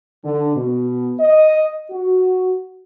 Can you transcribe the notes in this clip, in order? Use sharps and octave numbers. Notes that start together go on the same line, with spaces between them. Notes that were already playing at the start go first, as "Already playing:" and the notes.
D3
B2
D#5
F#4